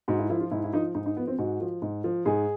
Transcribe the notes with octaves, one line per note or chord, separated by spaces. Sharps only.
G#2 F#4
E4
F3 E4
F4
G#2 E4
E4
F3 D#4
G#2 D#4
D#4
F3 B3
C4
G#2 F#4
F3
G#2
F3
G#2 G#4